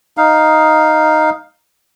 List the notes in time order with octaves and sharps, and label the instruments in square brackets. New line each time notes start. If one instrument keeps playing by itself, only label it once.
[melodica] D#4 F5